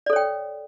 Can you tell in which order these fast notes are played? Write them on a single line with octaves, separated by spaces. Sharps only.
D5 A4 C#5 G5